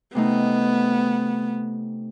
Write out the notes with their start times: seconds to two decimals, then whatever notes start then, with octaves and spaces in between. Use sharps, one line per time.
0.15 C3 A3 B3 D#4